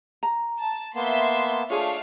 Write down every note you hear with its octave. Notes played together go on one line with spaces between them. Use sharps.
A#5
A5
A#3 B3 E5 A5 C6
A3 D4 F4 G#4 C#5 F5 G#5 C#6